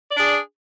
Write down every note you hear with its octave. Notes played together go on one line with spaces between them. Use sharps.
D4 G#4 D5